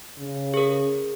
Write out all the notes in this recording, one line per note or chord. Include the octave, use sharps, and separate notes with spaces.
C#3
G#4 A#4